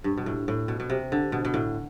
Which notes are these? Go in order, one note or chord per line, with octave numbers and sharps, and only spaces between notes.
G2
B2
A2
A2
B2
B2
C3
D3
B2
B2
A2